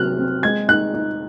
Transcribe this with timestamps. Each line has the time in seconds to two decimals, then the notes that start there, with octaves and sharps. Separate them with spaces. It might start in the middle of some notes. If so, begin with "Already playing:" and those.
Already playing: C3 F#3 C4 F6 F#6
0.18 C4
0.43 G#3 G#6
0.68 D#4 F#6
0.94 D#4